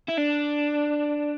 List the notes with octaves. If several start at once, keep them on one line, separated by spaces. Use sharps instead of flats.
E4
D4